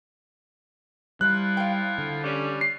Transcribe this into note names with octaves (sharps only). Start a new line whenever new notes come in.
F3 G3 E4 F4 F#6
F5 G5
D3
G3 C#4
C7